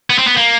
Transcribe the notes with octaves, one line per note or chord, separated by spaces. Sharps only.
B3
C4
B3
A#3